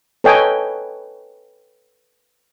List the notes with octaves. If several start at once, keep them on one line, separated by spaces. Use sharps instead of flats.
A4 B4 C#5 D#5 G5 G#5